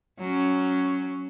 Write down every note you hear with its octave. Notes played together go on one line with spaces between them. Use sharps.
F#3 C#4